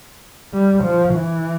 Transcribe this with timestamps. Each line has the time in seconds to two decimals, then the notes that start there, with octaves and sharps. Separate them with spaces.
0.54 G3
0.84 F3
1.14 E3